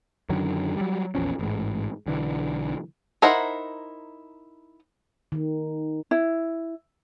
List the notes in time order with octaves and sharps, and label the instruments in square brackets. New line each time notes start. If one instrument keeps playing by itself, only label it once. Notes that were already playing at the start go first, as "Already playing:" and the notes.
[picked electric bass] F#2 D3 D#3 F#3
F#3 G3
A#1 E2 F3 C#4
A1 G#2
B1 D3 E3
[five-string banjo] D#4 E4 A#4 C5 F#5
[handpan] D#3
[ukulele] E4